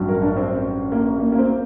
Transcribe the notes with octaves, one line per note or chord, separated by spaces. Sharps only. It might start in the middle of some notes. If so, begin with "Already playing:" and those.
Already playing: A1 G2 F#3
A#4
D4
C4
C4
A#3
A#3
A#3
C4